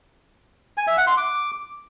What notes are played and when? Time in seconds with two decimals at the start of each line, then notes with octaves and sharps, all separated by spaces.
0.78 G#5
0.87 E5
0.97 F#5
1.07 C6
1.17 D6